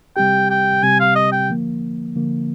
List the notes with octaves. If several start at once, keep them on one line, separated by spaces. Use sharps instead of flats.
C3 G3 C4 G4 G5
G5
C3 G3 C4 G4 G#5
F5
D#5
G5
D3 F3 A#3
D3 F3 A#3